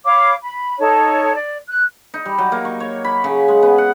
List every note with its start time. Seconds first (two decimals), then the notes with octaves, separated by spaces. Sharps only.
0.05 C#5 F5 B5 D6
0.40 B5
0.79 D#4 A4 C#5 A5
1.35 D5
1.68 F#6
2.14 D#4
2.26 G3
2.38 F#3
2.52 A#3
2.65 C#6
2.80 C#5
3.04 B5
3.24 C#3
3.48 G#3
3.63 B3
3.78 F#5